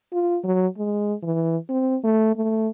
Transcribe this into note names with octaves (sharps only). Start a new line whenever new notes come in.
F4
F#3
G#3
E3
C4
A3
A3